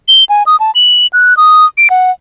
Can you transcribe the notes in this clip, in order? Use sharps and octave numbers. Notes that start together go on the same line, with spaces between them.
G7
G#5
D#6
A5
F#7
F#6
D#6
D7
F#5